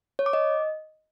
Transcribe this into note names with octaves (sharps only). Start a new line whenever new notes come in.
C#5
D6
D#5